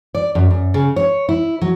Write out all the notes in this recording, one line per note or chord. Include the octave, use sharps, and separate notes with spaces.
D5
F#2
F#2
C#3
C#5
E4
F#3